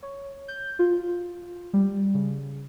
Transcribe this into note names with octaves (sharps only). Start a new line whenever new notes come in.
C#5
G6
F4
F4
G3
C#3